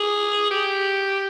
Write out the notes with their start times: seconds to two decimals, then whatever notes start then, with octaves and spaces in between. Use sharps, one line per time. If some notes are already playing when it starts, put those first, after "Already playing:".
Already playing: G#4
0.51 G4